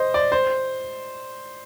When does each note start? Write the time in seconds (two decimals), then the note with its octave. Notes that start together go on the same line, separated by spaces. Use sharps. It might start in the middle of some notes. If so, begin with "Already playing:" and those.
Already playing: C5 D#5
0.14 D5
0.32 C5